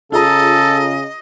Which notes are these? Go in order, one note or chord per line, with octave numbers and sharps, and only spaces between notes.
C#3 F4 G#4 A4 D#5 A#5